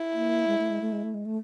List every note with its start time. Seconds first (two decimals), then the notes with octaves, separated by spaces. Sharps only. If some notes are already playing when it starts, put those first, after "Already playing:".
Already playing: E4
0.14 A#3
0.47 G#3
0.59 A3
0.70 G#3
0.81 A3
0.92 G#3
1.04 A3
1.14 G#3
1.26 A3